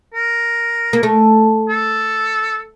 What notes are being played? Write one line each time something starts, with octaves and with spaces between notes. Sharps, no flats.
A#4
A#3
A3
A4